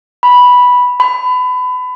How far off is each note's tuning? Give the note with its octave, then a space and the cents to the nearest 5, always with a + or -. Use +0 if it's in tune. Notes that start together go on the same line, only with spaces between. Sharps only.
B5 -5
B5 +25